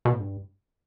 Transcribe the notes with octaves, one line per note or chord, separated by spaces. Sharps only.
B2
A2
G2